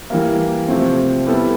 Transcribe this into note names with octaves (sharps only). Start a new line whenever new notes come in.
E3 G3 A#3
C3 F3 A3 C4
G3 B3 E4 A4